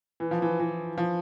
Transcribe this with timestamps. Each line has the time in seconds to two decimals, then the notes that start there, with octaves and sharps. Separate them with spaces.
0.20 E3
0.31 F3
0.42 E3
0.60 E3
0.98 F3